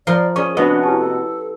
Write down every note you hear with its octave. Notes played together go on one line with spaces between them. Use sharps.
F3 A#4 D5 C6
C#4 G#4 D5 C#6
C3 B3 D4 F#4 D#5
C#4 E4 G4 A5
A4